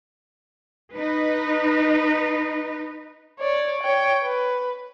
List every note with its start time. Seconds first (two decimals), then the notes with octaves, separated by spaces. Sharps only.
0.92 D#4 B4
3.39 C#5 D5
3.83 C#5 G5
4.24 B4